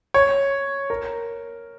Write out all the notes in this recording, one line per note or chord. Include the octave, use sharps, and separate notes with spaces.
C#5
A#4